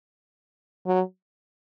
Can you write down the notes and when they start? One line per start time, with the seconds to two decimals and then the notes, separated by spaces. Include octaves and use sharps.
0.86 F#3